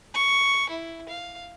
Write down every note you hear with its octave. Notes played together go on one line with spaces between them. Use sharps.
C#6
E4
F5